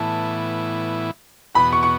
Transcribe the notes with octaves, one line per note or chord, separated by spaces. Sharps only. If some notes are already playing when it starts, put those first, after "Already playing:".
Already playing: A2 E3 B3 E4 A5
E2 B2 B3 F#4 B5
C#6
C#6